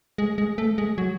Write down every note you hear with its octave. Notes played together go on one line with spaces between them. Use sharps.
G#3
G#3
A3
G#3
F#3